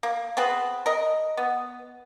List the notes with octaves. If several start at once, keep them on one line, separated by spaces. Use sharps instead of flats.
A#3
B3 C4 G#4 B4
A#4 D#5
B3